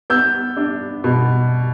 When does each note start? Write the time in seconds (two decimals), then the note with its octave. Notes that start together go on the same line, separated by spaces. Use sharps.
0.10 B3 E6 G6
0.57 D4
1.04 B2